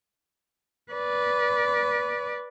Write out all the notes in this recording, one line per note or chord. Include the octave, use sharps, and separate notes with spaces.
B4 D5